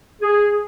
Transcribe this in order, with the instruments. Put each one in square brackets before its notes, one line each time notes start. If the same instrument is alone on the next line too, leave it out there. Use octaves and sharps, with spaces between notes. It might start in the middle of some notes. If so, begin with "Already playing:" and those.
[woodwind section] G#4